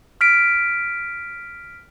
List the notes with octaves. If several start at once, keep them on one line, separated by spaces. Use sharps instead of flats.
F6 B6 D7